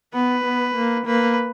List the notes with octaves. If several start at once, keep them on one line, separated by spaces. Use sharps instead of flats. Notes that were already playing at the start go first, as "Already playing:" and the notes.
B3 B4
B3
A#3
A#3 B4